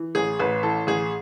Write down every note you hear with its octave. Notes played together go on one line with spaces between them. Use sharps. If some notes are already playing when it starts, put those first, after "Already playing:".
Already playing: E3
A1 G#4
A1 B4
E3 A4
A1 G#4